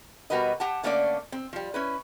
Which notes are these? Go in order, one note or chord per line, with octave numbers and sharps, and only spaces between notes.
B2 G3 F#4 A#4 B4 D#5
G4 F#5 A5
D3 A3 A#3 C#4 D#4 D5
C4
F3 G3
C#4 E4 B4